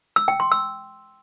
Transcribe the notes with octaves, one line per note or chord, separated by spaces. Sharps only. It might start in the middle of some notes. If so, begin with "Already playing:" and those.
E6
G5
C6
E6